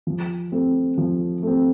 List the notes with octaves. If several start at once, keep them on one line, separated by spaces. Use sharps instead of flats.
F3
A3 C4
F3
A3 C4